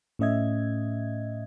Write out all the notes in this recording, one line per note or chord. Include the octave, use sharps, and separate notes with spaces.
A2 A3 C#4 D#5 E5 G#6